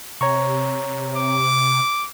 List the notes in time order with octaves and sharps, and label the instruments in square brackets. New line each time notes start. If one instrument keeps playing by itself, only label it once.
[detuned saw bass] C3 [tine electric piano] C#5 A#5 C#6
[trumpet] D6